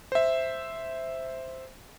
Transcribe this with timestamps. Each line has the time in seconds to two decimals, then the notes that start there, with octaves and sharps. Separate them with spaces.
0.12 C5 E5